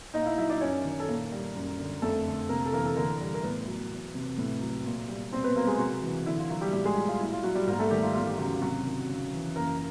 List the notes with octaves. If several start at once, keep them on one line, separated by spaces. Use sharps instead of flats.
A#2 D#4 D#5
F5
E4 E5
F#3 E4 E5
D4 D5
F#2 C#4 C#5
D#3
A4
A#2 A#3 A#4
G3
F#2
D3
F2 A3 A4
D3
C3 A#3 A#4
A4
E3 A#3 A#4
A4
D3 A#3 A#4
G3
A#4
A2 B3 B4
F#3
E2
C3
A2
F#3
A#2
G3
B2 C4 C5
B3 B4
F#3 A#3 A#4
G#3 G#4
C3 F#3 F#4
E3
D3 E4
F4
F3 F#3 F#4
G3 G4
A2 G3 G4
G#3 G#4
F#3
F4
A#2 E4
F4
F#3 G3 F#4
G3 G4
G#2 A#3 A#4
A3 A4
D#3 G3 G4
F4
E2 F4
G4
C#3 F#3 F#4
C3 F#3 F#4
D#3
C#3
E3
F#2 A#3 A#4